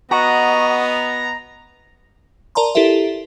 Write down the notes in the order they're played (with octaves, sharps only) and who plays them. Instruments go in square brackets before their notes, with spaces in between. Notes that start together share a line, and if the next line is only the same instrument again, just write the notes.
[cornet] B3 [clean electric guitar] F#4 [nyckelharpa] D#5 [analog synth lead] A#5
[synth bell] A#4 D5 A5 A#5 C6
E4 G4 A4 A#4 E5